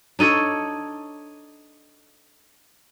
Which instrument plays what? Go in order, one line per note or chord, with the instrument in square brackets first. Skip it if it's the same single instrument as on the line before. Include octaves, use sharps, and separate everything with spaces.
[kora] D4 D#4 A4 C#5